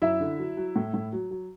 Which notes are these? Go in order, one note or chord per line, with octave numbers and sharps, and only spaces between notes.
F#2 E4 E5
D3
F#3
F#3
A2
A2
F#3
F#3